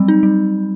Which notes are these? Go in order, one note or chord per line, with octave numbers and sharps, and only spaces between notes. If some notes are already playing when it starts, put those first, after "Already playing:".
Already playing: F#3 G3 C4
D#4
G3